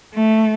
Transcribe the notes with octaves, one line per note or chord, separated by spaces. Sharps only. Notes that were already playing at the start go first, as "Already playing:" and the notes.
A3